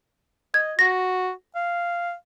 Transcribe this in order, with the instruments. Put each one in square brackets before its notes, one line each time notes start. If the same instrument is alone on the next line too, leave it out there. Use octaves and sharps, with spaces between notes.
[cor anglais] D#5 [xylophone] G#6
[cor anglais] F#4 [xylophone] A#6
[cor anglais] F5